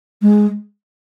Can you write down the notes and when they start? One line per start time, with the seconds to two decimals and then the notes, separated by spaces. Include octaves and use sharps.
0.22 G#3